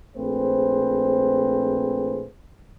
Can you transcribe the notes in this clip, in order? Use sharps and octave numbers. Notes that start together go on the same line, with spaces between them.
A#1 A3 C4 G#4 B4 C5